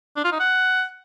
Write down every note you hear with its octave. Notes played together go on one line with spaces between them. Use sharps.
D4
F4
D#4
F#5